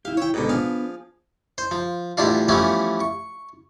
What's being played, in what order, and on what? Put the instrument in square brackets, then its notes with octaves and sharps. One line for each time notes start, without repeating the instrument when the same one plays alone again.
[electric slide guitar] E4 G4 [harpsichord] F5
[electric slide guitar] E4 [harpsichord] C#5 G5
[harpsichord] G#2 B2 D3 [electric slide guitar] F#4 G4
[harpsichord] F3 G#4 F5 [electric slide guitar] B3 D4
[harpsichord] C5
F3
E2 A2 G3 D4 F4
E3 F3 G3 A3 B3 C#4
C#6